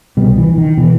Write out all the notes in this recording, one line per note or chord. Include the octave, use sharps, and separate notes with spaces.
C2 B2 G3
E3
E3
D#3
B2 E3